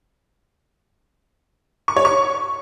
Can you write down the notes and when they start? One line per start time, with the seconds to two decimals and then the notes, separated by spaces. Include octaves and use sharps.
1.88 C#6
1.96 C#5
2.05 C#6